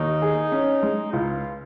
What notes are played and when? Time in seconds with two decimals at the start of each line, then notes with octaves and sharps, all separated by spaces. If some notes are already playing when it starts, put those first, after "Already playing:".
Already playing: D#2 D#4
0.22 G#4
0.52 C#4
0.83 G#3
1.12 C#2 F4